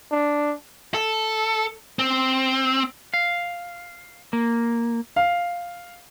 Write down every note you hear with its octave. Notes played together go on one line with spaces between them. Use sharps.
D4
A4
C4
F5
A#3
F5